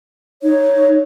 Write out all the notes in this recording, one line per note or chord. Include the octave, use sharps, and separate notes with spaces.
D#4 C#5